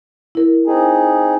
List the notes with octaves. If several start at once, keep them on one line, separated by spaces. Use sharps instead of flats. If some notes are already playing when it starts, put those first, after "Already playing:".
E4 A#4
C4 D#4 G#4